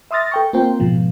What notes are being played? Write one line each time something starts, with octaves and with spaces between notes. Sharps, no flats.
E5 C6 D#6 F6 A6 A#6
A4 G5 C#6
A#3 C4 F4 C5 G5
G#2 B2 F3